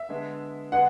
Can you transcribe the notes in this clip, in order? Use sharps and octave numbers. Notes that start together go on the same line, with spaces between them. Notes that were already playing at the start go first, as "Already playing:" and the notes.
Already playing: E5
D3 G#3 B3 D4
D3 G#3 B3 D4 F#5